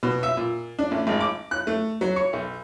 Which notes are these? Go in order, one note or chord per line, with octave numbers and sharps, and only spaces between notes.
B2
E5
A#2
D4
A1
G#1
D6
F#6
A3
F#3
C#5
B1